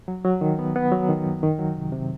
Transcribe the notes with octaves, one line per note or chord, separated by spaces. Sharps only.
F#3
F#3
D#3
B3
B3
F#3
D#3
F#2
D#3
F#3
C3
C3